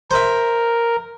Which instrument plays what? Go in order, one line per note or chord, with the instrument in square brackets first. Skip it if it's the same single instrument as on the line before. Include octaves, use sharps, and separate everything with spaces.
[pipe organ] A#4 [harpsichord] C5 E5